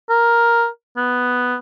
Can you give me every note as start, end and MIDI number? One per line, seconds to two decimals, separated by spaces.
0.10 0.67 70
0.97 1.57 59